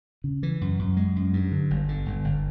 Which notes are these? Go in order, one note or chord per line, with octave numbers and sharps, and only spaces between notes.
C#3
E3
F#2
F#2
G#3
F#2
G2
D3
G1
D3
G1
G1